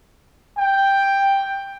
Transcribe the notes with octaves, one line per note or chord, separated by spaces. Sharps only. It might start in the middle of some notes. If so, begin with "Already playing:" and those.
G5